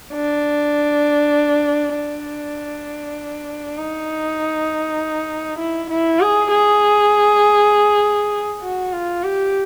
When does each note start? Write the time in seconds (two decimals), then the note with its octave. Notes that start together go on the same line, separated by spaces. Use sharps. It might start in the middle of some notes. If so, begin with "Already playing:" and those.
0.14 D4
1.96 D4
3.78 D#4
5.59 E4
5.90 E4
6.20 G#4
6.51 G#4
8.62 F#4
8.93 F4
9.24 G4